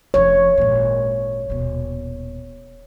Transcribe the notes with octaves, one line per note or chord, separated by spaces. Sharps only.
F1 F2 C#5
G#1 A#2
D#1 B2